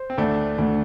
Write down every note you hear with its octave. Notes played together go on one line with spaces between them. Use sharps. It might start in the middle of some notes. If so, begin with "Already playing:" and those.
Already playing: C5
C4
D2 A3 D4
D2